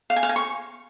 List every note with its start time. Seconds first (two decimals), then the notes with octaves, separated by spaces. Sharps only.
0.10 F5
0.16 G#5
0.23 F5
0.29 G#5
0.36 C#6